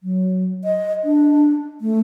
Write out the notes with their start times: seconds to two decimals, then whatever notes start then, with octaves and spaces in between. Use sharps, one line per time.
0.03 F#3
0.64 D#5
1.04 D4
1.81 A3